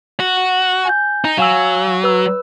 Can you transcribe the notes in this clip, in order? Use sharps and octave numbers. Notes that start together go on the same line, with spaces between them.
F#4
G#5 G6
D#4
F#3 F5 G#5 E6
B4 E6